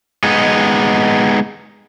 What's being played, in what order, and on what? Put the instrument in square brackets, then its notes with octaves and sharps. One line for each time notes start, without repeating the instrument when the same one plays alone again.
[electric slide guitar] G#3 B3 D#4